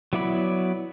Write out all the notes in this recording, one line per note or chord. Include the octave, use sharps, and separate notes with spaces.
F#3 B3 E4 D5 B5